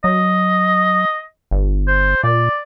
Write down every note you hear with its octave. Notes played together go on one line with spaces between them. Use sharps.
F#3 D#5
G1
C5
A#2 D5